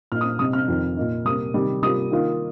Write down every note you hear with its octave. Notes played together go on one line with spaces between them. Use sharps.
A#2 A#3 D#4 F6
D#6
C3 G3 C4 D#4 D#6
F6
F2 D#3 C4
A#2 A#3 D#4
C3 G3 A#3 D#6
C3 D#3 G3
C3 G3 A#3 F4 D#6
D#3 A#3 F4